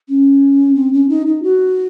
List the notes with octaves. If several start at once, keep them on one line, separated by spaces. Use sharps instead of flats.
C#4
C4
C#4
D#4
D#4
F#4